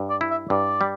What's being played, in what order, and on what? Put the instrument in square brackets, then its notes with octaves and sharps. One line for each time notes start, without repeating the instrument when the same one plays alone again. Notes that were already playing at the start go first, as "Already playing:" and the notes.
Already playing: [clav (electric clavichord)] G2
[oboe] D5
[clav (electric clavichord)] E4
[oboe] E5
[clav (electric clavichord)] G2 [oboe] D5
[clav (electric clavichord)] G3